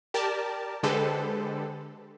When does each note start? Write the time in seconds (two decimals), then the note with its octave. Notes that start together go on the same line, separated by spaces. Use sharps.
0.14 G4 A#4 D5 A5
0.83 D3 G#3 G4 A4 B4 C5